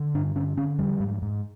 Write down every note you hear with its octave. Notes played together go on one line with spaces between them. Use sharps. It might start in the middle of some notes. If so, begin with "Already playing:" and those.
Already playing: D3
G2 D4
D3 C#4
D3 C#4
F2 G3
G#2
G#2